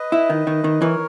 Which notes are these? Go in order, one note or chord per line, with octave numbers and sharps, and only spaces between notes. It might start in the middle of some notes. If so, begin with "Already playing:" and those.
Already playing: B4 D#5
E4
D#3
D#3
D#3
E3 A#4 C#5